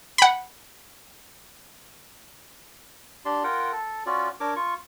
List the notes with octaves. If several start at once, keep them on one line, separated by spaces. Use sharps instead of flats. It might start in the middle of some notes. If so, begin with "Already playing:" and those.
F#5 B5
D4 G4 D5 C6
F4 A#4 F#5 G5
A4
C#4 F4 F#4 D5
D4 A#4 C#5 D6
F4 C#6